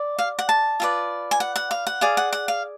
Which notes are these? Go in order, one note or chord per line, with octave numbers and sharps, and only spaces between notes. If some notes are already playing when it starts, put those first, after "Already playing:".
Already playing: D5
F5
F#5
A5
F4 G#4 B4 D5
G#5
F#5
F#5
F5
F#5
G#4 D5 F5
F#5
F#5
F5